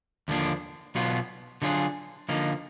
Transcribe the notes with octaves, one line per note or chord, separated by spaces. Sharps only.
D#2 D3 F3 A#3 D4
B1 B2 F#3 B3 F4
D3 F#3 D4 F4 G#4
D3 F3 A#3 D#4